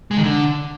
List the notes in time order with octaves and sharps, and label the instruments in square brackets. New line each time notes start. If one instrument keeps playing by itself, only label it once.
[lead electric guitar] G#3
D#3
D3